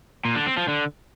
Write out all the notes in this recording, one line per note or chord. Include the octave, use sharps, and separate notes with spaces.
A#2
D3
C4
F3
D3